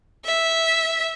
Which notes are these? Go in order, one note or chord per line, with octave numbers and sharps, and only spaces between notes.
E5